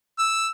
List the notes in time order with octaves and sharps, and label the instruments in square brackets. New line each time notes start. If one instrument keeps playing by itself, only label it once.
[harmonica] E6